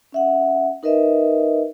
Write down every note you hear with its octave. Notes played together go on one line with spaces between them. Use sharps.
C#4 E5 F#5
D#4 A#4 B4 D#5 E5